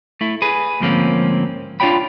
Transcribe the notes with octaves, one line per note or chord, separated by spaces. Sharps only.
A3 E4
G#4 B4
D2 G#2 F3 A#3 C4 C#4
D4 F4 G4 C#5 G5 B5